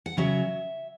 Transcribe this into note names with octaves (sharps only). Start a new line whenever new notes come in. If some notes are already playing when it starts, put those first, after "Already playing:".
F#5
C#3 F#3 C#4 E5